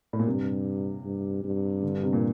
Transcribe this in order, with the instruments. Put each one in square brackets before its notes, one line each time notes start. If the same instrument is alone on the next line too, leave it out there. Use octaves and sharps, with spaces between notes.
[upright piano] A2
A#2
[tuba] G2 [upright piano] C3
[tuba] G2
G2
[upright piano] D3
C3
A#2